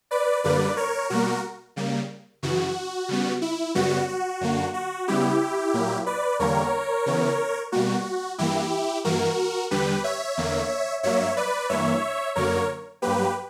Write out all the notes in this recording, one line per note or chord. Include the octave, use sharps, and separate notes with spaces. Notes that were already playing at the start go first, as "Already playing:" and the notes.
B4 D5
F#2 D3 G3 A#3 B4 D5
A#4 C#5
B2 G3 A#3 F#4 A#4
C#3 G3 A#3
F#2 C#3 E3 F#4
C#3 G3 B3
E4
F#2 C#3 G3 B3 F#4
F#4
F#2 D3 A#3
F#4
C#3 G3 B3 E4 G4
A#2 F#3 A#3
B4 D5
E2 D3 G3 A#3 A#4 C#5
C#3 E3 B3
B2 G3 A#3 F#4
G2 E3 A#3 E4 G4
G2 E3 A#3 F#4 A#4
E2 D3 G3 G4 B4
C#5 E5
E2 D3 A#3
G2 F#3 A#3 C#5 E5
B4 D5
G2 E3 A#3 C#5 E5
F#2 D3 F#3 A#3 A#4 C#5
G2 F#3 A#3 G4 B4